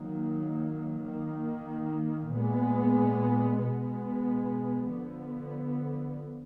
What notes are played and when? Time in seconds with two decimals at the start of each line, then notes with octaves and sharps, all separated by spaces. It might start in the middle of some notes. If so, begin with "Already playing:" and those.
Already playing: D#3 F#3 A#3
1.03 D#3 A#3
2.32 A#2 G#3 B3
3.60 B2 G#3 B3
4.88 D3 F3 B3